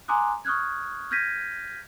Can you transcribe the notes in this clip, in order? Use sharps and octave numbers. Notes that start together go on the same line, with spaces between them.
G#5 A#5 C6 D6 D#6 F#6
C#6 D#6 F6 F#6 G#6
F6 G6 G#6 A#6 B6 D#7